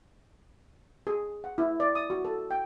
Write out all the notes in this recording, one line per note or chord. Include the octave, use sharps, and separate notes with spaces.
G#4
F#5
E4
D5
D#6
F#4
A4
G5